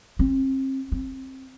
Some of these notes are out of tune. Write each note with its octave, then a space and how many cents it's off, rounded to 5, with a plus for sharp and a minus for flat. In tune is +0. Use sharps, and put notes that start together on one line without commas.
C4 +35
C4 +20